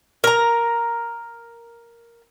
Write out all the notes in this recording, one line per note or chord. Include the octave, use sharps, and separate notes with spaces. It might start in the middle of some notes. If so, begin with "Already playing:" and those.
A#4 A#5